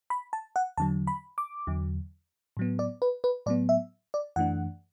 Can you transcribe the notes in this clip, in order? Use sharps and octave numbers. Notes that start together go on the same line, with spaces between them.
B5
A5
F#5
E2 D3 F#3 A5
B5
D6
E2 D3 F#3
A2 F#3 B3
D5
B4
B4
A2 F#3 B3 D5
E5
D5
F#2 E3 A3 D4 F#5